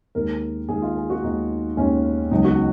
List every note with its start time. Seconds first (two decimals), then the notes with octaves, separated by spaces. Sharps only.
0.15 D#2 D#3 G#3 A#4
0.69 D#2 D#3 G#3 G#4
0.82 F4
0.96 G#4
1.10 F#4
1.23 D#2 D#3 G#3 D#4
1.77 D#2 D#3 G#3 C#4
2.31 C#2 C#3 F#3 B3 D#4
2.44 F#4